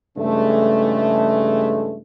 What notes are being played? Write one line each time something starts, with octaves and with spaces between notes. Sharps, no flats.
G2 C#3 E3 G#3 A3